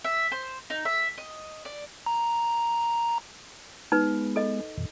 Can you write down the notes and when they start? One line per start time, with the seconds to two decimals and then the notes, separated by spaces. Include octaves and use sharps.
0.04 E5
0.32 C5
0.70 D#4
0.85 E5
1.18 D#5
1.65 D5
2.06 A#5
3.92 G#3 B3 D#4 B4
4.36 A4 D#5
4.77 F2 A#2 D#3